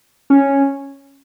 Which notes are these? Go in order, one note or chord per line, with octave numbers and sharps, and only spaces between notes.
C#4